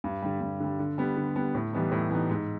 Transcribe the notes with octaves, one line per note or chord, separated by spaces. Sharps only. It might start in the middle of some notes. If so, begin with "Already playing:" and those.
G2
D3 G3
G2
D3 G3
D3
G3 B3
D3
G3 B3
A2
E3 G3 B3 D#4
A2
E3 G3 B3 D#4
G#2